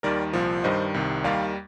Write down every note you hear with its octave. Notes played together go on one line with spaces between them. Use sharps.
D#2 D#3 G3 A#4 D5
C2 A#2 F3
G2 D#3 G3 C5 D#5
C2 C3 D#3
D#2 D#3 G3 D5 F5